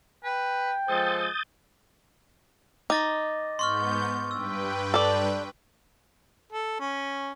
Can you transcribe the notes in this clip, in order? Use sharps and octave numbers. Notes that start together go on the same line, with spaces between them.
B4 G5
F3 G#3 A4 C5 D#6 G6 A6
D#4 D6 A6 A#6
G#2 B3 C6 C#6 F6 G6
G2 B4 G5 E6
A4 D5
A4
C#4